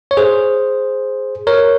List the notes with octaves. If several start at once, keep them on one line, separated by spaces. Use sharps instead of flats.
C#5
G#4 C5
A#4 C#5